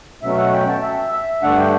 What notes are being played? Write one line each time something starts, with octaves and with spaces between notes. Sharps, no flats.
B2 F#3 A3 C#4 E5
F#5
G5
A5
E5
E5
G2 D3 A3 D4 F#5
G5